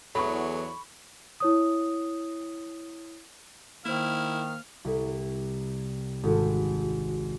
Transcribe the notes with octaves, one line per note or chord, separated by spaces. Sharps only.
E2 F#3 A4 B5 C#6
E4 C#5 D#6
D#3 A#3 E4 C5 F6
C2
G#1